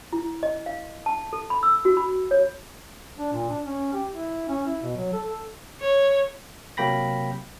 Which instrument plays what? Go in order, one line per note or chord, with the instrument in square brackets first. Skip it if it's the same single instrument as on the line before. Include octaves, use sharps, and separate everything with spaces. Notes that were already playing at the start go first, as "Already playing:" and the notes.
[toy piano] E4
D#5
F5
A5
A4
B5
E6
F#4
B5
C#5
[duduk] D4
A#2
D4
C#4
G4
E4
C#4
E4
B2
F#3
A4
A4
[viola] C#5
[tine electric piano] C3 F#3 A#3 G5 B5 A#6